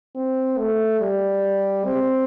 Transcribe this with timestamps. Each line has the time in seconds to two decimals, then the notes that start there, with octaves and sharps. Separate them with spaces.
0.15 C4
0.58 A3
1.00 G3
1.85 C4